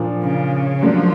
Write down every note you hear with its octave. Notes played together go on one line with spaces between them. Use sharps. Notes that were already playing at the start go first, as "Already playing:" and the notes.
Already playing: A#2 F3 A#3 D4 F4
C#3
F3 F#3 A#3 D4